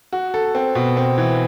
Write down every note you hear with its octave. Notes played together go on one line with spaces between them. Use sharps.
F#4
A4
C4
B2
C4
E3